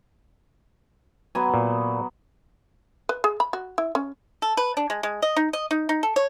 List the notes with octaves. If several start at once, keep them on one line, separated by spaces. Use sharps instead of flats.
F#3 B3 G#5
A#2
B4
G#4
B5
F#4
E4
C#4
A4
B4
D4
G#3
G#3
D#5
D#4
D#5
D#4
D#4
A4
C#5